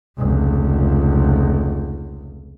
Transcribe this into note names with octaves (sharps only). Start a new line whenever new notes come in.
F1 C#2